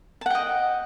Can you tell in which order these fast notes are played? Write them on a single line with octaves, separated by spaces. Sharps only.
A5 F#5 G5 D#5